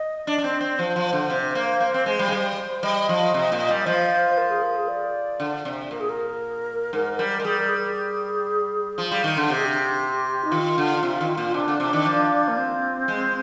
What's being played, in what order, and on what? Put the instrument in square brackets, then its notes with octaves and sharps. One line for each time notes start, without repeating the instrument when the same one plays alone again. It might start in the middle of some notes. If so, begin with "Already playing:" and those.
Already playing: [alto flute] D#5
[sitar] D4 [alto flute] D5
[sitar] D4
C4
C4
[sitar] F3 [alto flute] C5
[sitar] F3
D3
C3
A#3
A#3
C4
G#3
G3
G#3
G3
[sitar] G3 [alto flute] D#5
[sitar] F3
C3
A#2
G3
[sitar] F3 [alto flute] C5
[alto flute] C5
A#4
G#4
A#4
G#4
D5
[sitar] D3
C3
[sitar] A#2 [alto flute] A#4
[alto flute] G#4
A#4
[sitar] G#2
G3
G#3
[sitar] G3 [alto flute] G#4
[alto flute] A#4
G#4
[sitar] F3
G3
D#3
D3
[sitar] C3 [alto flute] G4
[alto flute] G#4
G4
D#4
[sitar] D#3 [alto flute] F4
[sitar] D3
C3
D#3
A#2
[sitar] C3 [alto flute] D4
[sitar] D3
C3
D#3
F3
[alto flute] A#3
C4
[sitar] G#3